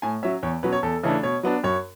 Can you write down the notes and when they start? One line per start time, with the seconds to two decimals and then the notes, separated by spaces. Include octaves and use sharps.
0.02 A2 G#5
0.23 F#3 C#4 E5
0.43 E2 C#5
0.63 B2 F#3 C#4 B4
0.72 C#5
0.83 E2 A4
1.03 C#3 E3 A3 D4
1.23 B2 C#5
1.43 F#3 B3 D4
1.64 F#2 C#5